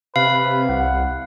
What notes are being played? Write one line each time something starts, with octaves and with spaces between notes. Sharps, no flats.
C3 B4 F5
C2 F#5